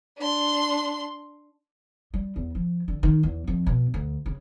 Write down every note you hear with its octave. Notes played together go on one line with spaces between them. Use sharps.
D4 C6
G3
E2
F3
D3
D#3
E2
F2
B2
D2
C#3